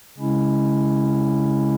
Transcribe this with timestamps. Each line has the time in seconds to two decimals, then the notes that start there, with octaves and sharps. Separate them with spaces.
0.18 C#3 G#3 C#4 E4